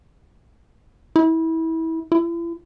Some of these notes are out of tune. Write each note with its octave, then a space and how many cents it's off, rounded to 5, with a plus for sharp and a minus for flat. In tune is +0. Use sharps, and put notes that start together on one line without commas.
E4 -25
E4 +40